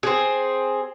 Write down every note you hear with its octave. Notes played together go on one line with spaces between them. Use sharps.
C4 G#4